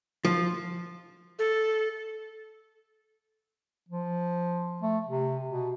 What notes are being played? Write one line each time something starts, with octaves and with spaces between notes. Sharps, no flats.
F3
A4
F3
A3
C3
B2